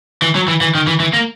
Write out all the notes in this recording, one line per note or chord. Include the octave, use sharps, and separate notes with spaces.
E3
F#3
E3
E3
D#3
E3
E3
A#3